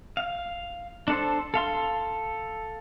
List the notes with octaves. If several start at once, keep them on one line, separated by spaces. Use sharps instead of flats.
F5
D4 A4 C5
A4 F5 C6